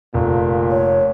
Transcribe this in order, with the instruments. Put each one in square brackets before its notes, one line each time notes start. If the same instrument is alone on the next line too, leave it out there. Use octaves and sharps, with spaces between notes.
[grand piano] F1 [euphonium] A#2
[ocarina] C#5